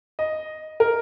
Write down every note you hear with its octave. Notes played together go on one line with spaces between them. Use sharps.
D#5
A#4